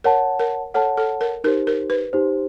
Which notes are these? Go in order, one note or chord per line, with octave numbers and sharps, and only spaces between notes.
A#4 C#5 F#5 A5
A#4
A4 C#5 F#5 A5
A4
A#4
D#4 G4 A#4 C5
A#4
B4
D#4 G4 C5